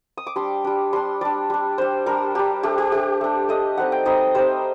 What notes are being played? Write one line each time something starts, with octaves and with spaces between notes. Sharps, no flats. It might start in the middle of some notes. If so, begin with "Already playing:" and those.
D#6
D6
G3 D4 C6
G3 D4
G3 D4 C6
G3 D4 D5
G3 D4
G3 D4 C5
G3 D4 A#4
G3 D4 G4
A3 D4 G4
G4
A3 D4 G4
A3 D4
A3 D4 D#5
G3 C4 D#4 F#5
G5
G3 C4 D#4 D#5
G3 C4 D#4 C5